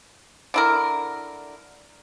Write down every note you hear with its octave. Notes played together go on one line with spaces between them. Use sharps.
D3 E4 A#4